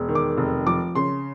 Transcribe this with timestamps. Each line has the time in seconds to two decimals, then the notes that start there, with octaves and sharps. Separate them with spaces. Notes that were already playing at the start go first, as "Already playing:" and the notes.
Already playing: E1
0.09 D#3
0.15 D6
0.37 F1
0.66 F3 D6
0.95 C#3 C6